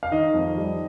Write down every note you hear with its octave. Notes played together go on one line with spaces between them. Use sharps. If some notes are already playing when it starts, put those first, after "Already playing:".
F5
D#3 D#5
F2
G3